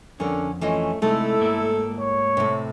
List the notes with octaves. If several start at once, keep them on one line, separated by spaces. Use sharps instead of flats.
F2 D3 C#4 A#4
E3 A3 C#4 F4 D#5
C3 G#3 A3 D#4 E4 A4
G#2 A#3 A#4
C#5
A2 C3